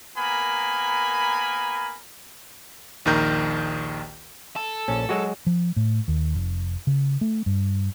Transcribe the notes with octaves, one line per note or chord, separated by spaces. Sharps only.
A#3 B3 A#4 G#5 B5
A#1 D#2 D#3 A#4 G6
A4
A#1 C#4
F#3 G#3 F#4
F3
A2
D#2
F1
C#3
A3
G2